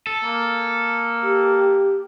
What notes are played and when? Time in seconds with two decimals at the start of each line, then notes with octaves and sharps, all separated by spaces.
0.07 A4
0.24 A#3
1.22 G4